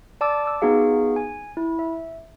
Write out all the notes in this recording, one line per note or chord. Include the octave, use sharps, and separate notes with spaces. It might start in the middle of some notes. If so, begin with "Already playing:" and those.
D5 A5 D6 E6
D6 E6
B3 D#4 F#4 G#4 F5
G#5
E4
E5